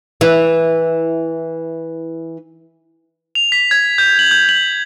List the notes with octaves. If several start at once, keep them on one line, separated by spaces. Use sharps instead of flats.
E3 E4
F7
B6
G#6
G6
F#7
G6
F#7